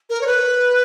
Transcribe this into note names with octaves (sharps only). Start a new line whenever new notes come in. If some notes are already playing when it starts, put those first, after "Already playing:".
A#4
C#5
B4